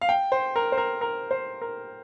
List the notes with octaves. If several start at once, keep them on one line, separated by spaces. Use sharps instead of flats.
F5
G5
C5
A#4
C5
A#4
A#4
C5
A#4